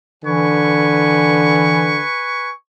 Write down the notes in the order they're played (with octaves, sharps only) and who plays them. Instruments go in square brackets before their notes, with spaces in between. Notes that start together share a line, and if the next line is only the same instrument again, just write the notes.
[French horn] D3 [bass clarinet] E3 [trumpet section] B4 G#5 C#6